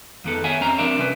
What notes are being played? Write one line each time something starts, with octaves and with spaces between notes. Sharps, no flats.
F2 D#3 B3 A4
C#5 E5 F#5 G#5
F2 C4 C#4 C5 A#5
F3 C4 D4 A#4 D5 E5
C2 C#4 B4